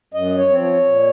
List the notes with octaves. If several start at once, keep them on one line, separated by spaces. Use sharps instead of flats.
F#2 D#5
C#5
F3 C4
C#5
A#2